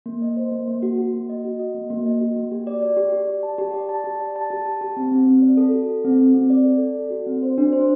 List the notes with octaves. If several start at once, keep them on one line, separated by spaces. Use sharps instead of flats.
A#3
D#5
C5
A#3
A#3
F#4
F#4
A#3
D#5
F#4
D#5
A#3
A#3
D#5
F#4
A#3
G4
D5
D5
G4
G4
D5
A5
G4
D5
A5
G4
D5
A5
G4
A5
G4
C4
C4
C4
D5
A4
F#4
A4
C4
C4
C4
D5
A4
D5
A4
F#4
C4
C5
D4
C5